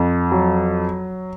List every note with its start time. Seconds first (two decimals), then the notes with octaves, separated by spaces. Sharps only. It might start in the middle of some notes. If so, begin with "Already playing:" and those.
Already playing: F2
0.32 F#3